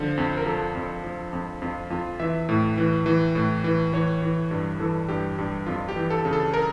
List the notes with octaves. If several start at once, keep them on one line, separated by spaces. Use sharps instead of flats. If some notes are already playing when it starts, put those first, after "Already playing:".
Already playing: D3 F3
F2
A#4
F3 A4
F2
F3
F2
F2 F4
F2 F4
E3 E5
A2
E3
E3
A2
E3
E3 C#5
E3
G2
E3 A4
G2 G4
G2 G4
F2 F4
G4
E3
A4
C#3
A4
A#4